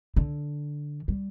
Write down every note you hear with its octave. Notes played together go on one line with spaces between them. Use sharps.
D3
G3